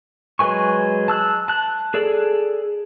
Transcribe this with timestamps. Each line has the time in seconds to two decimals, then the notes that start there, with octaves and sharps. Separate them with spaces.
0.39 F#3 G#3 B4 G#5 C#6
1.08 A5 E6 F#6
1.48 A5 F#6
1.94 G#4 A4 D5